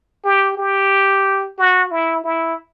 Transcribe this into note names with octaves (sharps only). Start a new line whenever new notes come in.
G4
G4
F#4
E4
E4